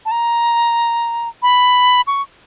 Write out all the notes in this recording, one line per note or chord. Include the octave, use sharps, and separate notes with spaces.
A5
A#5
B5
C#6